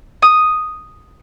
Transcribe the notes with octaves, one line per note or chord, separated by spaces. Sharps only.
D#6